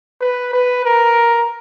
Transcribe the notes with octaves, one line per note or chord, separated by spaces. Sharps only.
B4
B4
A#4